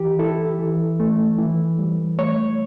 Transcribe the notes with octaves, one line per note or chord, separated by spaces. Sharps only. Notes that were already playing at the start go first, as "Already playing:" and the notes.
Already playing: E3 G4
E4 A4
E3
A3
E3
G3
A3 C#5